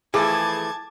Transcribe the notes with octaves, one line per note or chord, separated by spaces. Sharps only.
E3 F3 A3 G#4 A5 D6 G#6